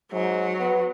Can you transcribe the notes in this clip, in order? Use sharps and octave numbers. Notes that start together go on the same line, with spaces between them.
G#2 F#3
B3